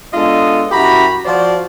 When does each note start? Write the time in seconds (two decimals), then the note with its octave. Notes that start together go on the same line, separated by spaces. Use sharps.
0.14 G#3 B3 D4 F4 A4 D#5
0.72 F#2 E4 F#4 G4 A#5 B5
1.26 F3 F4 F#4 C5 D5